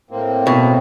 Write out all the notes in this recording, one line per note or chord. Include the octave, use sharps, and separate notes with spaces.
A2 A#3 C4
B2